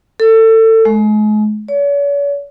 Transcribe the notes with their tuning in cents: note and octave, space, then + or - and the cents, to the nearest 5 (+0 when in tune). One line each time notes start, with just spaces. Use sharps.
A4 +25
G#3 +40
C#5 +45